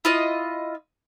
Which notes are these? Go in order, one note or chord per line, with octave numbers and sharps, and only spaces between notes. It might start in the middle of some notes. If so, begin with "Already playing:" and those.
E4 F4 D#5